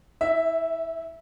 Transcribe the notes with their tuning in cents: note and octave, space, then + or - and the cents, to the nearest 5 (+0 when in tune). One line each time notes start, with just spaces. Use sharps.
E4 -30 E5 +0